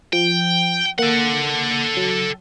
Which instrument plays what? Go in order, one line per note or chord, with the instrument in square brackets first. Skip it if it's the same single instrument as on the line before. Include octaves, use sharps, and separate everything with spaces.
[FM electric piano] F3 [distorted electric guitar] G5
[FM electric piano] A#3 [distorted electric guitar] A4 F#5
[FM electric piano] F#3